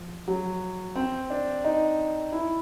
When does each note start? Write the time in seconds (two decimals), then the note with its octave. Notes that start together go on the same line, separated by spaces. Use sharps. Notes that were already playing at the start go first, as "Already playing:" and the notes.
Already playing: F3
0.28 F#3
0.96 C4
1.30 D4
1.64 D#4
2.32 E4